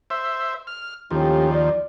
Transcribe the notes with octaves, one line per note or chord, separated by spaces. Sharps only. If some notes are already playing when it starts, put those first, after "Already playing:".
C5 E5
F6
D#2 A2 F3 C#4 G4
D5